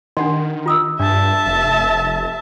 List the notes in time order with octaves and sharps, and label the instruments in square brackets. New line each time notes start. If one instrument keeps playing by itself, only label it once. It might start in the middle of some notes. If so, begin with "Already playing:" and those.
[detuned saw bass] D#3 [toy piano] D4 F#5 C6
[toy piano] F4 D#6 E6
[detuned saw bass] G2 [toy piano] D4 [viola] E5 A5
[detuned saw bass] F1